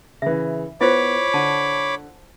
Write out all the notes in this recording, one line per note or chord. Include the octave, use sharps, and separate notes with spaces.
C#3 E3 E5
B3 E4 F4 C5 C#5 B5 D6
D3 A5